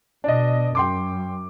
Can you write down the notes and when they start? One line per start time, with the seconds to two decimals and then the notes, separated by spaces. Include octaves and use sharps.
0.24 B2 D4 D#5
0.75 F#2 G5 C6 D6